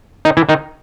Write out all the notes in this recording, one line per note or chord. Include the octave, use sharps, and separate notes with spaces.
D#3 D#4
E3 E4
D#3 D#4